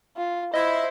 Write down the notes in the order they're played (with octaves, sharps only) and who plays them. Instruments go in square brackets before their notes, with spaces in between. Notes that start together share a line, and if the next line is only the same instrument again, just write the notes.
[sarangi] F4
[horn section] E4 [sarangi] C5 [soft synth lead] D#5